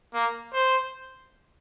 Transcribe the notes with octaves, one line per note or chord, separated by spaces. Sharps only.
A#3
C5